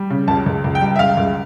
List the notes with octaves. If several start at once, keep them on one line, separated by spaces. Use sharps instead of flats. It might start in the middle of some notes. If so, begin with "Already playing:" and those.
Already playing: G3
C#3
C#2 A5
C#2
C#2
G5
G3
E5
C#2 F5
C#2